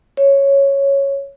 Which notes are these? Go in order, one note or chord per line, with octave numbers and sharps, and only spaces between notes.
C#5